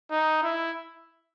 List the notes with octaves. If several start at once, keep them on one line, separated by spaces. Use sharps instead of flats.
D#4
E4